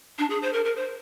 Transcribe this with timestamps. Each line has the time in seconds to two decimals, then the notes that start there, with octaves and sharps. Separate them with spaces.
0.19 D4
0.30 G#4
0.42 C5
0.53 A#4
0.65 A#4
0.76 C5